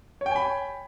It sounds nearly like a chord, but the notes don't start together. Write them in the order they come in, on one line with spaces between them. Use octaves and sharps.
C#5 G5 G#5 B5